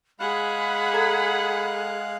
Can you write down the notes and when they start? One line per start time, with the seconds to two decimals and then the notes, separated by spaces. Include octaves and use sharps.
0.20 G#3 G#4 F5 F#5 B5 F#6
0.93 A4 A#5 G#6